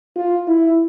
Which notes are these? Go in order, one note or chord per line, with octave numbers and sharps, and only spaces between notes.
F4
E4